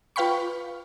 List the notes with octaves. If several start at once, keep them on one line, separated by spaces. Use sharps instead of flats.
F4 B4 F5 G5 B5 C#6